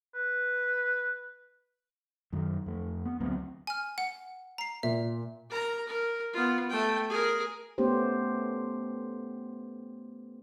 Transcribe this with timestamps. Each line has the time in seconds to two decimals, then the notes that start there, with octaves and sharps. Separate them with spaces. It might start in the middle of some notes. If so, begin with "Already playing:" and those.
0.14 B4
2.33 F#2 D#3 F#3
2.66 F2 A3
3.05 B3
3.20 D2 F#3 B3 C4
3.67 G#5 F6
3.98 F#5
4.58 A#5 C7
4.83 A#2 E5
5.50 A#4 A#5
5.87 A#4
6.33 B3 F4
6.70 A3 G5
7.09 G#4 A#4
7.78 A3 B3 C#4 G4 C5